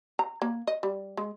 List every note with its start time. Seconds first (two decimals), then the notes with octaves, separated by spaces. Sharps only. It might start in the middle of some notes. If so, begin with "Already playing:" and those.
0.19 A#5
0.42 A#3
0.67 D#5
0.83 G3
1.17 G#3